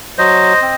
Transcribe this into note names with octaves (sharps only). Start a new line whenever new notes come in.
F#3 C5 D#5
C4